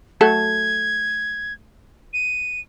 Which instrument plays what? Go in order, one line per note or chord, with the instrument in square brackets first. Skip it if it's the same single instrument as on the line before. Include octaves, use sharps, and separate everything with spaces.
[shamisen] F#3 A3 A4 [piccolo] G#6
[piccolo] D#7